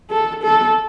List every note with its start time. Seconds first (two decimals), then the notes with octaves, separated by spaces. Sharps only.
0.11 A4
0.43 A4